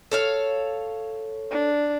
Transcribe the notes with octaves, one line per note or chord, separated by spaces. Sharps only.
A4 C#5 F5
D4